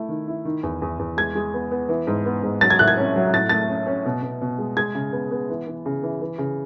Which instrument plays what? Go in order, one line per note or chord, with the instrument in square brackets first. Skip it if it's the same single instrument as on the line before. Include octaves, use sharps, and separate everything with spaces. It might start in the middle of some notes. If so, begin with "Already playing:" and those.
Already playing: [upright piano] A3 E4
D#3
E4
D#3
E2
E2
E2
G#3 G#6
G#3
B3
B3
E3
G#2
B3
G#2
F#3 A6
G#6
A2 F#6
G#6
C#4
F#3
A2 A6
A3 A6
C#4
C#4
B2
B2
B2
G#3
G#3 G#6
C#3
B3
B3
E3
E3
C#3
E3
E3
C#3